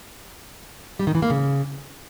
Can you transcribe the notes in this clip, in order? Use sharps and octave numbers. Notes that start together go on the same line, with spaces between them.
G3
D#3
E3
A#3
C#3